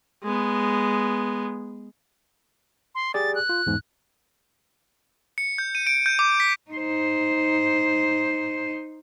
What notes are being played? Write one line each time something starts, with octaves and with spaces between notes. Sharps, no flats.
G#3 B3
C6
G4 G#4 D5 A6
F#6
F4
E2 G#2
C#7
G6
D#7
D7
G6
D6
B6
D#4 C5